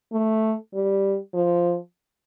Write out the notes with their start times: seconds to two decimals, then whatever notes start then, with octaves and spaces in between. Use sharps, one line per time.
0.12 A3
0.74 G3
1.35 F3